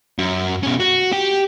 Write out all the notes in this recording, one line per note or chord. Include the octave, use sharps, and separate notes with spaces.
F#2
B2 C#4
F#4
G4